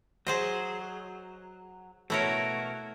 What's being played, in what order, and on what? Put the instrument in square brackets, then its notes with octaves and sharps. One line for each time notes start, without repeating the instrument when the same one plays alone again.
[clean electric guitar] F#3 [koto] G#4 C5 D#5
[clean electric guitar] B2 F#4 A#4 [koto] A3 E4 C#5